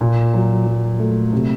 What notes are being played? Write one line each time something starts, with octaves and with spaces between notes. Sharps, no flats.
A#2
F#3
F#3
A3
C3